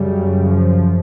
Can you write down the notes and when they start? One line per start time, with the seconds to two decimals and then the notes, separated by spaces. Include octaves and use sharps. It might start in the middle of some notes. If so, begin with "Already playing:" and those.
Already playing: F#2 C#3 G3
0.47 F3